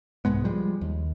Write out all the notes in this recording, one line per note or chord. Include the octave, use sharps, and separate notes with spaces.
C2 G#2 G#3 B3
F3 G3 G#3
D#2